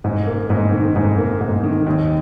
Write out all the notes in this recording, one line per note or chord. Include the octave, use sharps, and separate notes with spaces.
G#2
A#3
G#2
D#3
G#2
A#3
G#2
D#3
D#2